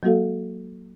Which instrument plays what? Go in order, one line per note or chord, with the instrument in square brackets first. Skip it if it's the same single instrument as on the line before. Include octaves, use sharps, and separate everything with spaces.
[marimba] F#3 G#3 A#3 F#4 A4 F5